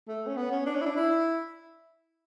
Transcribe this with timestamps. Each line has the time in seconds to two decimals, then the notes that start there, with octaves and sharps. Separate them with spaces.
0.08 A3
0.26 C#4
0.37 B3
0.52 C#4
0.66 D4
0.76 C#4
0.81 E4
0.86 D4
0.96 E4